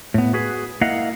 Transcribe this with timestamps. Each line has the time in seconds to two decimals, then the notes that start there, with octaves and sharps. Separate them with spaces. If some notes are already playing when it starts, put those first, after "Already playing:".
0.14 A2 B3
0.33 F#4 G#4 B4
0.81 A#3 E4 D#5 F5 F#5